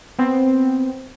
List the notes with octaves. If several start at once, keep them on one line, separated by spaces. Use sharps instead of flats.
B3 C4